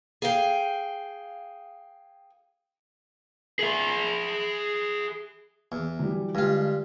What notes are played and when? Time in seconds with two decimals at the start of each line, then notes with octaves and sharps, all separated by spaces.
0.22 G#4 F5 G5
3.59 G#4 E5
5.72 E2
5.99 E3 F#3 G3
6.35 G2 D3 G3 G#3 F4